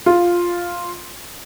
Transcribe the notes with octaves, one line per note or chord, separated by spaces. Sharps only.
F4